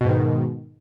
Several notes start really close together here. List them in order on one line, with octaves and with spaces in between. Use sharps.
B2 G#2 D#3